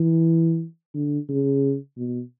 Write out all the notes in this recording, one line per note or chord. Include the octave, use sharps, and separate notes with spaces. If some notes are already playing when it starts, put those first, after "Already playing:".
Already playing: E3
D3
C#3
B2